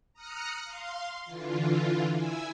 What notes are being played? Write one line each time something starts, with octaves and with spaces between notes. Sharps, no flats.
A#5 D#6 F6 F#6 C#7
F5 C6
D3 E3 F4
E4 G#5 E6